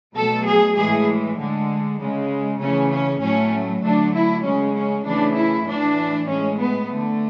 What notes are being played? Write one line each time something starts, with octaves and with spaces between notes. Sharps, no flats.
B2 F#3 A3 A4
G#4
A2 E3 G#3 G#4
D3 G#3
C#3 G#3
C#3 E3 A3 C#4
C#4
A2 F#3 A3 C#4
D3 F#3 A3 D4
E4
C#3 G#3 C#4
C#4
C#3 E3 A3 D4
E4
A2 E3 A3 D4
A2 G#3 C#4
B3
D3 A3